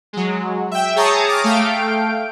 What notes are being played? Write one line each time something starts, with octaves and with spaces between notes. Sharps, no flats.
F#3 G#3
E5 G5
G#4 C#5 A5 A#5 C#6 D#6
D6 D#6 F6
A3 F5 G5 D7